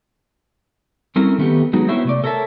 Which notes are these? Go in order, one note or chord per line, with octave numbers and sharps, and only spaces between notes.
G3 A3 C4 C#4 E4 A#4
D#3 A3 B3 G4
F#3 G#3 B3 D#4 F#4
B3 C4 E4 C5 C#5 E5
C3 A3 D5
A4 A#4 C#5 E5 A5